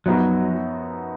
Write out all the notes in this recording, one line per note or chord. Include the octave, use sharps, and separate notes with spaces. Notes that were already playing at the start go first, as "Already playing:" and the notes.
F#2 F3 F#3 B3 D#4 F#4